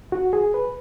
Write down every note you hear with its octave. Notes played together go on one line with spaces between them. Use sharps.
F#4
G#4
B4